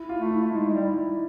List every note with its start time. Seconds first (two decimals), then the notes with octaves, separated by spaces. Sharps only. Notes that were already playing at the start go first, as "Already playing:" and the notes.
Already playing: E4
0.09 F4
0.20 A3 F4
0.31 E4
0.44 A3
0.52 G#3 D#4
0.69 G#3
0.74 G3
0.84 E4